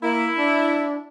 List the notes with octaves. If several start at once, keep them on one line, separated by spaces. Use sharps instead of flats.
A#3 E4
D4